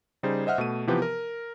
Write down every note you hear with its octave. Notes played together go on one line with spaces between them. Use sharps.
C#3 G3 D#4 G#4 C5
C5 D#5 E5 F#5 F6
B2 A3 D#7
C3 E3 F3 B3 G4 B4
A#4